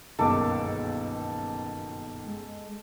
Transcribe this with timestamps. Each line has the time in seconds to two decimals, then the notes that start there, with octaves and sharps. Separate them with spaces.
0.19 G1 C#2 F#2 B2 D#3 A#3 A4 D6
2.25 G#3